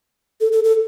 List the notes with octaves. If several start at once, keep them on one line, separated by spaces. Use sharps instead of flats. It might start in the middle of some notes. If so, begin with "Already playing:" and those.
A4
A4
A4